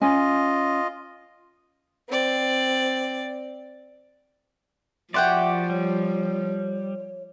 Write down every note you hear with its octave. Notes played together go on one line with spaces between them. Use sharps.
C#4 F4 D#5 G#5
C4 D5
F3 F#4 G4 C5 D5 E5 F#5 G5
G3 C#5